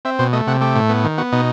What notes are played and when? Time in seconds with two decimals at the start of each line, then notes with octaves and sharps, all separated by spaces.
0.05 C4 E5
0.19 B2 C5
0.33 A3 D#5
0.47 C3 F#5
0.61 A3 G4
0.75 A2
0.89 B3
1.04 D#3
1.18 B3 F#4
1.32 B2 D#4